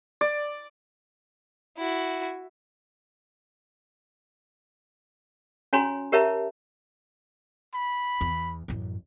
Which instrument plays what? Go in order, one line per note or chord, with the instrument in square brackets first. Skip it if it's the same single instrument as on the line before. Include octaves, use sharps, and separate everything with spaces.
[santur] D5
[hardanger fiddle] E4 F#4
[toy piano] C#4 F#4 C#5 G#5 A#5 C6
G4 A#4 C#5 E5 A5 A#5
[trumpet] B5
[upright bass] E2
A1 F#2